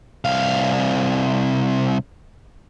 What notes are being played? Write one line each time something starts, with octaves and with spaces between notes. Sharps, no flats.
C2 F5